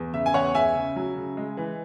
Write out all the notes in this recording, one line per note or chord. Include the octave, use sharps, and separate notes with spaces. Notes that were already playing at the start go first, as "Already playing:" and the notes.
Already playing: E2
C#3 E5
G#5
E2 C#5 F#5
C#2 E5 G#5
C#3
F#3
C#3
G#3
E3